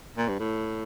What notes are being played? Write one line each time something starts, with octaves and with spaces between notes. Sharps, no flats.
A#2
G2
A2